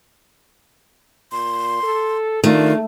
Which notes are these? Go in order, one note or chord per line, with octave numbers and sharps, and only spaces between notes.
A#2 C6
A4
D#3 A3 D4 F4